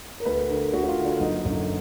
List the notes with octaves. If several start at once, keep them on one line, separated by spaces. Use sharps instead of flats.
A#4
D2 B4
D3 A#4
D2 F#4
F#4
F4
D3
D4
F#1 D#4
F#2 D3